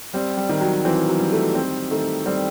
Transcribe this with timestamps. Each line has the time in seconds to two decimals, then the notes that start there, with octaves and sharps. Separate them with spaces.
0.13 G3 C4
0.37 G3
0.49 D#3
0.61 F#3
0.85 E3 C4
1.09 F#3
1.20 G3
1.32 A3
1.55 C4
1.91 D#3 A3
2.26 G3 C4